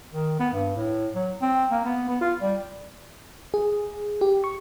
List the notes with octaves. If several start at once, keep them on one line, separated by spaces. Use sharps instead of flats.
D#3
B3
G2
A2
F#3
C4
A#3
B3
B3
F4
G3
G#4
G4
C#6